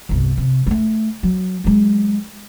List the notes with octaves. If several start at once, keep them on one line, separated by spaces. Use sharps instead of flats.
G1 C2
C3
G#3 A3
F#3
F#3 G#3